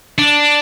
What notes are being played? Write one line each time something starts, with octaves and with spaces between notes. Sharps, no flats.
D4